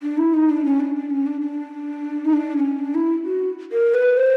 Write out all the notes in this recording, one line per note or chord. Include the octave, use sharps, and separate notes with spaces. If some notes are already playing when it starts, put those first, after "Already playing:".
D4
E4
D#4
D4
C#4
D4
D4
C#4
D4
D4
D#4
D4
C#4
D4
E4
F#4
A#4
B4
C5